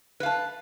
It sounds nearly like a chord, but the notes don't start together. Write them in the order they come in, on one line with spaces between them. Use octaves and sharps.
B4 F5 A5